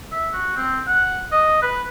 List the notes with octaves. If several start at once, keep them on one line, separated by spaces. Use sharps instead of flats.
E5
F#4
C4
F#5
D#5
B4